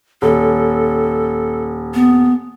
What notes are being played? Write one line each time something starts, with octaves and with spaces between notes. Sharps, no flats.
D#1 A4
B3